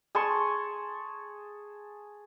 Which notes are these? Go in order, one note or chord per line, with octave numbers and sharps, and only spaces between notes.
G#4 A5 C6 C#6